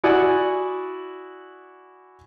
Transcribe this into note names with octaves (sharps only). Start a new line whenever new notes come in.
E4 F#4 D5 F#5 G#5 D#6